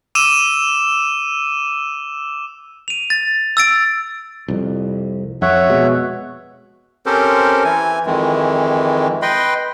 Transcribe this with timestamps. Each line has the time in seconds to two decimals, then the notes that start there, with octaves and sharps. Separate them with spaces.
0.15 D6 E6 D#7 E7
2.88 D#7 F7
3.10 A6
3.57 E6 A6 D7
4.48 C2 F2
5.42 F2 C#5 E5 F#5
5.70 B2 G#3
7.06 C4 C#4 G4 A4 A#4 C5
7.64 E3 G#5
8.06 F2 D#3 E3 G#3
9.22 B4 D#5 G5 B5 C6